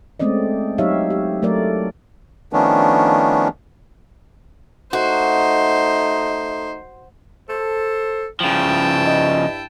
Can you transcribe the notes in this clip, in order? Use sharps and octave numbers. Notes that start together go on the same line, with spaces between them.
G#3 A3 C4 C#4 D5 D#5
F#3 D#4 G4 C#5 E5 F5
G4
F#3 A3 A#4 D5
D#3 F3 A3 B3 C#4 D4
A3 D#4 F#4 C5
A4 C5
G2 C#3 F3 E4 G5 A5
D#5